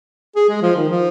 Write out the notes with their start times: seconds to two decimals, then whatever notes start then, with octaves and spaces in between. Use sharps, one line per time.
0.36 G#4
0.49 G#3
0.62 F3
0.76 D#3
0.89 F3